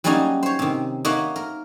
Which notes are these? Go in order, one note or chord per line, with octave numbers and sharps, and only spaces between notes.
F#3 G3 A#3 C#4 D#4 G#5
C5 C#5
C3 D#3
A#3 D#4 C#5 D#5 E5 F#5
A#4